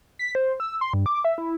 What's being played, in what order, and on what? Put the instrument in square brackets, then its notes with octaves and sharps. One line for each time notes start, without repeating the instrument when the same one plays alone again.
[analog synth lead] B6
C5
E6
C6
G2
D6
E5
E4